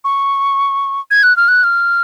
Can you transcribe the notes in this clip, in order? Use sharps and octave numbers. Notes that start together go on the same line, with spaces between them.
C#6
G#6
F#6
F6
F#6
F6